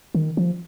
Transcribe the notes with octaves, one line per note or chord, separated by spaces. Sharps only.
D#3
F3